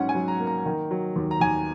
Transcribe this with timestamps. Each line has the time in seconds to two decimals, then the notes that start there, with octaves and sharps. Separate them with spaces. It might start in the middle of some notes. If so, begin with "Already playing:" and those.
Already playing: G#2 F#3 C#4 F#5
0.09 G#5
0.15 F#3
0.28 A#5
0.40 A#3
0.47 A#5
0.66 D#3
0.91 F#3
1.16 D#2
1.31 A#5
1.40 D#2 G#5